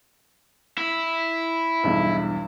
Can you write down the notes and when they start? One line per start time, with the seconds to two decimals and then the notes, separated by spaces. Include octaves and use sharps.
0.78 E4
1.84 B1 E2 G2